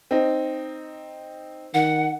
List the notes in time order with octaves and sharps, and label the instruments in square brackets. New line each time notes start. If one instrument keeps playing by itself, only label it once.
[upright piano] C4 D#4
[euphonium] D#3 [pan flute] F#5